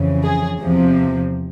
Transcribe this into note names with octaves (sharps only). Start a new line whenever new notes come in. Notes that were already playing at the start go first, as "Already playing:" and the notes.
Already playing: F2 C#3 E3
G#4
E2 C3 F3